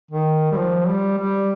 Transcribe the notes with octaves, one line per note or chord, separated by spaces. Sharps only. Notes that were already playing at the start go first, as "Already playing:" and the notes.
D#3
G3
F3
G3
G3